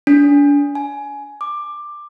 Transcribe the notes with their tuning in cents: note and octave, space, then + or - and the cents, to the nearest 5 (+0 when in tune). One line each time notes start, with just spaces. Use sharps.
D4 -35
G#5 +15
D6 +15